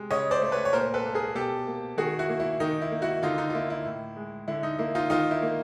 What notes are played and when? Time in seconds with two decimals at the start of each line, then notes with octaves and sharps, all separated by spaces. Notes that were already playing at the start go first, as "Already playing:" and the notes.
Already playing: C3 G#3
0.11 C#3 C#5 D#5
0.31 C5 D5
0.42 A3
0.52 B4 C#5
0.65 C#5
0.73 A#2 A#4 C5
0.94 A4 B4
1.04 A#3
1.14 G#4 A#4
1.35 B2 G4 A4
1.67 A#3
1.97 D#3 F#4 G#4
2.19 E4 F#4
2.29 A#3
2.40 E4
2.60 D#3 D#4
2.82 E4
2.92 A#3
3.02 E4 F#4
3.23 D3 D#4 F4
3.38 D#4
3.50 F4
3.54 A#3 E4
3.70 E4
3.86 A2
4.16 G#3
4.48 D3 E4
4.63 D#4
4.79 A#3 E4
4.95 D#4 F4
5.10 D#3 D#4 F4
5.31 E4
5.42 A#3